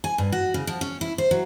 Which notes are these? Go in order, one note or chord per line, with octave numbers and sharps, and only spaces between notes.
G#5
G2
F#4
C#3
F3
C#4
E4
C5
F#3